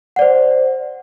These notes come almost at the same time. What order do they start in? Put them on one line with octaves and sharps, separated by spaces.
F#5 D5 C5